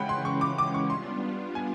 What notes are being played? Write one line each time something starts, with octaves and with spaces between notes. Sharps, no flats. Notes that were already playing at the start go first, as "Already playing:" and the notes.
Already playing: C#3 E3 G#3 C#4 F#5 G5 B5
C6
C#6
D6
D6
C#6
G3 B3 D4 F4 C6
G#5